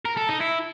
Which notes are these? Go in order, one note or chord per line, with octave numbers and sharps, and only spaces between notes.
A#4
A4
D#4
E4